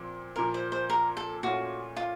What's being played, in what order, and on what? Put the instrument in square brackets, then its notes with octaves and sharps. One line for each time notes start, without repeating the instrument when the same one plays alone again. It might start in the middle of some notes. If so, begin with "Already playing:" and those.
Already playing: [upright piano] A#2 F3 C4
[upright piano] A#2 F3 A#3 [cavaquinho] A#4
[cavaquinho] C5
C5
A#4
A4
[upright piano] A#2 A3 C#4 F4 [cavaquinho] F#4
[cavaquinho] F4